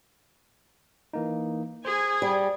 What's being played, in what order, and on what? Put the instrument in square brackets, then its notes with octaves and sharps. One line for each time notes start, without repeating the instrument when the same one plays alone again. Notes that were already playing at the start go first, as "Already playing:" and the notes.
[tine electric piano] E3 A#3 D#4
[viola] G#4 G#5 [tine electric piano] C5
[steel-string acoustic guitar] G3